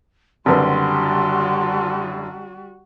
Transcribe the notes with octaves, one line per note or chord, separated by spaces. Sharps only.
F#1 D3 G3 C4 F#4 A#4 B4 C6